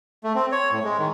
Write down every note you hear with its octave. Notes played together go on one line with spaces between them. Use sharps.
A3
C4
C#5
A2
G#3
D#3